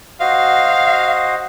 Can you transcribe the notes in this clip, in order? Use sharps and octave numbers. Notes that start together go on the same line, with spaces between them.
F#4 C5 D#5 F5